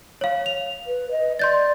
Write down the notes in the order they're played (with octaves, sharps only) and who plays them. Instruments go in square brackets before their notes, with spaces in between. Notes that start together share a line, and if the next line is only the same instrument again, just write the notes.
[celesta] C#5 F5
F7
[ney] B4
D#5
[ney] D5 [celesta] C6 G6 A6